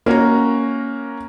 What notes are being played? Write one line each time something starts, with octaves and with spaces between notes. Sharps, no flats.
A#3 C#4 F#4 A#5